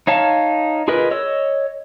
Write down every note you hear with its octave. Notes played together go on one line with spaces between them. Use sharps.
D#4 C#5 F5 A5
F4 G#4 A#4 B4 D#5
C#5 D#5 E6